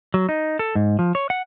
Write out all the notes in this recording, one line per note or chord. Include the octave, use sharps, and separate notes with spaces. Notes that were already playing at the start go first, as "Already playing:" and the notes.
F#3
D#4
A4
G#2
F3
C#5
F#5